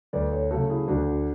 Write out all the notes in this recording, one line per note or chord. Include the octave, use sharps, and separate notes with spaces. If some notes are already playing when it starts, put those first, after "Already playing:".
D2 B4 D5
A4 C#5
C#3 F#3 A3 F#4 A4
E4 G#4
D2 D4 F#4